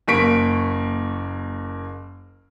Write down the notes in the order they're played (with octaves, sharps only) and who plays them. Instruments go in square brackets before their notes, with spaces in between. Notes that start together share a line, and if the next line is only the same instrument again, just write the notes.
[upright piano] F#1 A#3 C#6 B6 D7